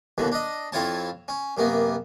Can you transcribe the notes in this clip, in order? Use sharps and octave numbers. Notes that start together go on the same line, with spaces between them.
D#2 B2 D3 E3
D4 D#5
F2 C4 E4 F4 C#5 A5
C#4
F#2 C3 A#3 B3